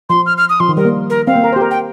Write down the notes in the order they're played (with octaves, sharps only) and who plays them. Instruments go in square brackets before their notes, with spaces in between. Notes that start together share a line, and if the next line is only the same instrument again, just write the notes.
[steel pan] F3 [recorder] C6
[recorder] F6
F6
D#6
[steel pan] F3 [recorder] C6
[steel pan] D#3
[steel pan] G3 [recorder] A#4
[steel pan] A#3
[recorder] A#4
[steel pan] C4 [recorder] F5
[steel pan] A#3
A#4
G4 C5
A#4
[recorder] G5